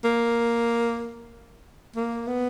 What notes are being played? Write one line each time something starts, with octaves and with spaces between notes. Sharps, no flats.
A#3
A#3
B3